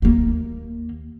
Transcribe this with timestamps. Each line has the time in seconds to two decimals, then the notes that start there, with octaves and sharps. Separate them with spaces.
0.02 D#2 A#3